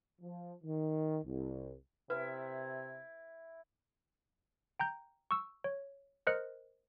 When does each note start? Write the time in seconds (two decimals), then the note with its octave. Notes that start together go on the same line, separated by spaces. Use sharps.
0.21 F3
0.63 D#3
1.24 C2
2.10 C3 E4 B4
4.80 G5 A#5 G6
5.31 C#6 E6
5.64 C#5
6.27 A#4 C5 D#5 F6 F#6 C#7